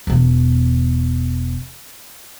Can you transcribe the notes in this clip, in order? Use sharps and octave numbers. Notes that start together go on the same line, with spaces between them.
E1 E2